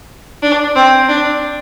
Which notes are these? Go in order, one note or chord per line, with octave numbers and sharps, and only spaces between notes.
D4
C4
D4